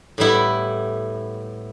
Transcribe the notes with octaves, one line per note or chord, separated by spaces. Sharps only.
A2 G3 B3 E4